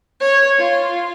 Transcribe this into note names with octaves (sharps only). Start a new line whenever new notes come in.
C#5
F4